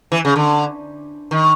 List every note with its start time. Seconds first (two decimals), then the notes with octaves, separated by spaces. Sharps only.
0.12 E3
0.25 C#3
0.36 D3
1.31 D#3